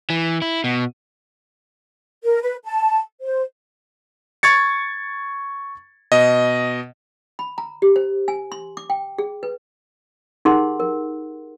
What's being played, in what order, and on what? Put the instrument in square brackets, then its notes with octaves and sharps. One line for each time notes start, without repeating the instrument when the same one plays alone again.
[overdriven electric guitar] E3
E4
B2
[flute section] A#4
B4
A5
C5
[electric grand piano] C#6 G#6 A6 C#7
B2 D#5
[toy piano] B5
A#5
G4
C5
G#5
C6
D6
G5
G#4
B4
D#4 G4 G#4 A#4 F#5 C6
A#4